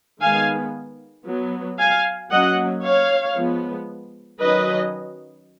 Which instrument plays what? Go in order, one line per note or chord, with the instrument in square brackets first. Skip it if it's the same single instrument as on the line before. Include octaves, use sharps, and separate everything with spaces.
[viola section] D#3 G#3 B3 F5 G#5
F#3 B3
F5 G#5
F#3 A#3 C#4 D#5 F#5
C#5 F5
F3 G#3 B3
D#3 F#3 C#4 B4 D#5